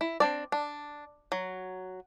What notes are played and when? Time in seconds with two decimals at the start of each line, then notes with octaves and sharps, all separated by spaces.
0.01 E4
0.20 C4 D4 D5
0.52 D4
1.32 F#3